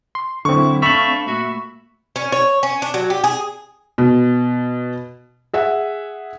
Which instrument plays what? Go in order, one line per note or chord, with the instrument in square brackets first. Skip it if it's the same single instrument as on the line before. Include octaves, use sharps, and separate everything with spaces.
[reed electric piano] C6
[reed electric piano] D3 C4 [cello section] F#3 E4 [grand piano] C#6
[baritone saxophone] A3 [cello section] C4 D4 F5 [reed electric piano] B5 [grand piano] C#6 F#7
[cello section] A#2 A3 E5 [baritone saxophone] F#4
[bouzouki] C#4
C#5
C#4
D4
F#3
G4
G#4
[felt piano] B2
G#4 E5 F#5